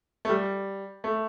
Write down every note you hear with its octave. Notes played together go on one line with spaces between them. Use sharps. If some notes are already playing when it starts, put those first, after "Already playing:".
A3
G3
A3